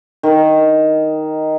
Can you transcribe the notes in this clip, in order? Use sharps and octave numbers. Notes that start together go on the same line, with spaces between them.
D#3